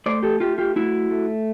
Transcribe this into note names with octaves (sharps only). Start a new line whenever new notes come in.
A3 C5 D5
G4 A4
A3 F4 G4
F4 G4
A3 E4 F#4
A3